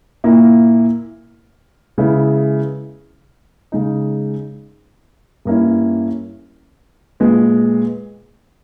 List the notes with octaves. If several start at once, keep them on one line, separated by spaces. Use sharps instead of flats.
A#2 A#3 E4
C#3 G#3 B3 E4
C#3 G#3 D#4
G2 G3 A#3 C#4 E4
A#2 G#3 B3